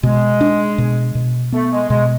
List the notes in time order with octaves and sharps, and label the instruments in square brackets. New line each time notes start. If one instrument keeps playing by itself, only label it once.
[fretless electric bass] B2 [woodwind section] G#3
[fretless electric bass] D4
B2
B2
[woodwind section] A3 [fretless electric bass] B3
[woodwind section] G#3
[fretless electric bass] B2 [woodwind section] G#3